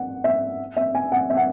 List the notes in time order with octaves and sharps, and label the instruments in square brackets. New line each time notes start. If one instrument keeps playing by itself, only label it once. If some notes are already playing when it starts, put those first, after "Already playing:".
Already playing: [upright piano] F#5
E5
E5
G#5
F#5
E5
F#5